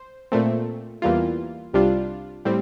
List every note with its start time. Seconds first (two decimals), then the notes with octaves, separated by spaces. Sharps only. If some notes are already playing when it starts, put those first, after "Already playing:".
Already playing: C5
0.32 A#2 A3 C4
1.02 E2 E3 G3 A#3 F4
1.73 C2 C3 G3 D4 F4
2.45 A2 G3 C4